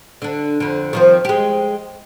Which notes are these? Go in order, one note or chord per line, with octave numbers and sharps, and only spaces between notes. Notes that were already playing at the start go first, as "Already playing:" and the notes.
D3 D4
F2 D3
D#3 F3 C4
G#3 G4